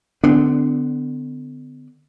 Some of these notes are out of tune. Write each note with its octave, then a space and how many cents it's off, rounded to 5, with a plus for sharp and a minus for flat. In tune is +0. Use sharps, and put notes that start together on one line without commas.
D3 +10 B3 +35 D4 -5